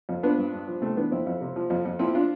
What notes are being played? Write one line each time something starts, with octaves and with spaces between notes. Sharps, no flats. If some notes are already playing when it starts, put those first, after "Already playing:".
F2
F3 B3 D4
G2
G2
F3
C3 A3 C4
E3 B3 D4
F2 C4 E4
F2
C3
F3
F2
F2
F3 C4 E4
D4 F4